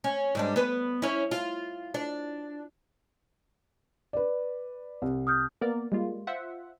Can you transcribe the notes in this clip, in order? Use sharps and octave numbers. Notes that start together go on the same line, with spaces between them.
C#4
G#2 G3 D4
B3 B4
C#4 E4
F4
D4
B4 D5
C2
D#6 F6 G6
A#3 B3 A#4 D5
G3 G#3 A#3 F4
F4 C5 E5 F#5